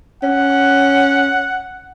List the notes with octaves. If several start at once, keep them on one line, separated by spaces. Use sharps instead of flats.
C#4 F#5